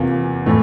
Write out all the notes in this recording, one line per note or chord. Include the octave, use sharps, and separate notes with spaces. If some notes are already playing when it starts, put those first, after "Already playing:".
Already playing: E2 C3 E3 A#3 F4
A2 E3 A3